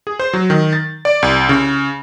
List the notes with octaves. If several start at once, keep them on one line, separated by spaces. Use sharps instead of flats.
G#4
C5
F#3
D#3
A6
D5
C2
C#3